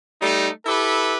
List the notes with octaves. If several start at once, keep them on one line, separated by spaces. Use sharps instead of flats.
G3 A3 D#4
E4 G4 A4 B4